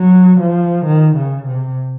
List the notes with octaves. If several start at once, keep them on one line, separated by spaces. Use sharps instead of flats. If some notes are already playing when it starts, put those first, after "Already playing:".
Already playing: F#3
F3
D#3
C#3
C3